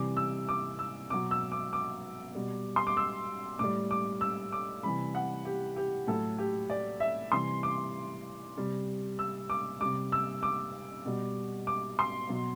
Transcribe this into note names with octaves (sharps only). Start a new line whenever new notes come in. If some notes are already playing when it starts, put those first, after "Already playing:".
Already playing: C3 E3 G3 D6
E6
D6
E6
B2 F#3 D6
E6
D6
D6
B2 G3
C6
D6
E6
A2 G3 D6
D6
E6
D6
C3 E3 G3 B5
F#5
G4
G4
A2 F#3 A4
G4
D5
E5
C3 E3 G3 C6
D6
C3 G3
E6
D6
C3 G3 D6
E6
D6
B2 G3
D6
C6
B2 F#3